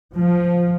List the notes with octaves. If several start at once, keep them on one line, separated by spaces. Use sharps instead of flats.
F3